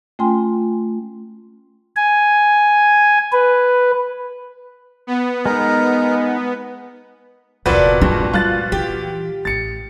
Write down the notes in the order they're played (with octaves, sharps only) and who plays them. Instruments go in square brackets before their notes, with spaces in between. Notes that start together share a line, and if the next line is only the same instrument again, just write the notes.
[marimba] A3 C#4 F4 G5 G#5 C6
[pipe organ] G#5
B4
[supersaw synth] B3
[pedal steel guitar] G#3 D#4 [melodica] A#4
[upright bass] F1 E2 [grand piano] A#2 F#4 B4 [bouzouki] C4 D4 A4
[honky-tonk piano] G2 [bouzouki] F3 [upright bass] G#3
[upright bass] G3 [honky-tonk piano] F4 F#6 A6
[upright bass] E3 [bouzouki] G4
[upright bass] A1 [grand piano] A6 C#7